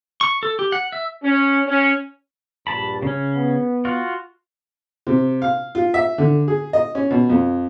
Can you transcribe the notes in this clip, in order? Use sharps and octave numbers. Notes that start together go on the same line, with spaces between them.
C#6
A4
G4
F#5
E5
C#4
C#4
A#1 G2 A5 B5
C#3 C#4
B3
F4 F#4
C3
F5
F4
E5
D3
G#4
D#5
C#4
B2
F2